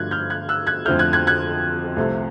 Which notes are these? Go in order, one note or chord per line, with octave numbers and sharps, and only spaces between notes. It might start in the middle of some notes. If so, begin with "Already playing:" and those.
Already playing: G2 D3 F3 A3 F#6 G#6
F6 G6
F#6 G#6
E6 F#6
F#6 G#6
F2 D3 F3 A3 F6 G6
F#6 G#6
F#6 G#6
F#6 G#6
C2 C3 F3 A3